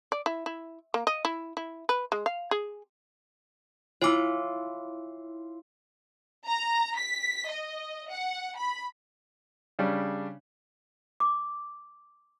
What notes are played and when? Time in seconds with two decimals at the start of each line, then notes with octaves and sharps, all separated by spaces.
0.12 D5
0.26 E4
0.46 E4
0.94 A#3
1.07 D#5
1.25 E4
1.57 E4
1.89 B4
2.12 G#3
2.26 F5
2.51 G#4
4.02 E4 F4 C#5 G#5 D6
6.47 A#5
6.97 B6
7.48 D#5
8.10 F#5
8.57 B5
9.79 C#3 G3 C#4 D4
11.20 D6